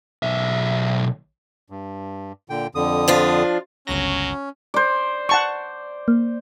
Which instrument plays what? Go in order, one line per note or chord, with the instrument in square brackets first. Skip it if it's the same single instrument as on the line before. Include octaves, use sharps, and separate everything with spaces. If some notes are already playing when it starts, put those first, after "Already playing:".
[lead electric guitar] B1 E5
[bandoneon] G2
A#2 D3 G5
F2 D3 D#6
[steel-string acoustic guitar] F3 D4 F4
[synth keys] G1 C#2 A#6 [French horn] F#3 [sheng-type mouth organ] C#4
[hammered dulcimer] C5 D5
[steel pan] F#5 A5 C#6
[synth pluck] A#3